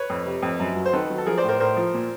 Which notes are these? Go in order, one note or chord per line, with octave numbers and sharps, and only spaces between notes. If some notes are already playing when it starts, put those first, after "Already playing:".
Already playing: B4 C#5
F2
C3
F2
F#2
F#3
C5
D#3 A4 B4
F#3
A4
F3 G#4 A#4
C5 D5
A2
A#4 C5
A2 A#4 C5
F3
A#2